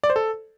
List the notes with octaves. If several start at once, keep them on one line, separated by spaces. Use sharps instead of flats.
D5
C5
A4